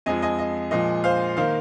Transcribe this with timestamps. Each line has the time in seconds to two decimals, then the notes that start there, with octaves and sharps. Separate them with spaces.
0.06 F2 F3 G#3 D#5 G#5
0.22 D#5 G#5
0.39 D#5
0.71 A#2 F3 G#3 D#5
1.04 C5 F5
1.37 D#3 A#3 C5 F5